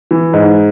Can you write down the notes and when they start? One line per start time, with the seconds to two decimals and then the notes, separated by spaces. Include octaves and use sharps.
0.11 E3
0.33 G#2